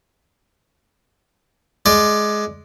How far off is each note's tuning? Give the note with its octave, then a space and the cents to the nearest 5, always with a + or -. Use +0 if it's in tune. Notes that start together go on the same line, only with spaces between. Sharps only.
G#3 +15 D5 +15